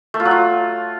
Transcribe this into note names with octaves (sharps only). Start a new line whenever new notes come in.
A3
F4
F#3
F4